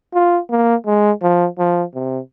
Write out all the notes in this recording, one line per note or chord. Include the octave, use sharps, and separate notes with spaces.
F4
A#3
G#3
F3
F3
C3